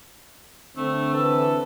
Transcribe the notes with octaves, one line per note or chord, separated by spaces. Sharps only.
D3 A3 C4
E3 A4 B4